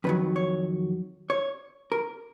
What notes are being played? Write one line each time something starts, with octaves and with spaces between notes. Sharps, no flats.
F2 D#3 F#3 B4
C#5
C#5
A#4